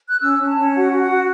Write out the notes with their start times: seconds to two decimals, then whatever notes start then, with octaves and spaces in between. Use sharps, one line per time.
0.09 F#6
0.21 C#4 E6
0.39 C#4
0.47 A5
0.56 C#4
0.75 F#4 F#5
0.92 F#4
1.01 F#5
1.10 F#4